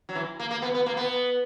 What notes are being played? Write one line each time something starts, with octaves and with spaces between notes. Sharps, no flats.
F#3
E3
A#3
A#3
B3
B3
A#3
B3